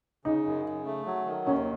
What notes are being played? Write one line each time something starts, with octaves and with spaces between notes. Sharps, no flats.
C#3 D#4
F#2
C#3
A3
F#3
D#3
D#2 C#4